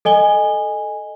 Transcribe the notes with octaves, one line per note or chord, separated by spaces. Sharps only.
A4 D#5 G#5 G7